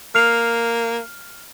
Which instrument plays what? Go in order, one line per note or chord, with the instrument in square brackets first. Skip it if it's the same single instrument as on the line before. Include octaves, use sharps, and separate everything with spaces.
[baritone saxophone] A#3 [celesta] F6 C7 F7